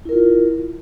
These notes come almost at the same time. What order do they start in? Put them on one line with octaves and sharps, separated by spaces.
E4 A#4 F4